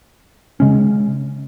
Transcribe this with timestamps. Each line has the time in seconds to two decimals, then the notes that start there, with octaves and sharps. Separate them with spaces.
0.60 C#3 G#3 C#4